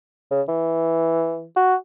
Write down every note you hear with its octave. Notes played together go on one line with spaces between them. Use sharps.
C#3
E3
F#4